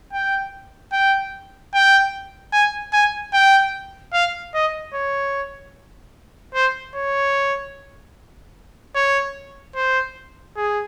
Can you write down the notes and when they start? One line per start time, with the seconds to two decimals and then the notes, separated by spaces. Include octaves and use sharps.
0.13 G5
0.92 G5
1.74 G5
2.53 G#5
2.93 G#5
3.33 G5
4.13 F5
4.54 D#5
4.94 C#5
6.54 C5
6.95 C#5
8.95 C#5
9.75 C5
10.56 G#4